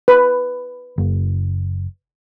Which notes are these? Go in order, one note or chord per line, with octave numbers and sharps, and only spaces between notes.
B4
F#1